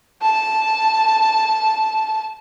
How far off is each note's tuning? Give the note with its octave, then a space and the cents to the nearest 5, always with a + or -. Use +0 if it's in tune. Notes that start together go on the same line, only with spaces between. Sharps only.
A5 -10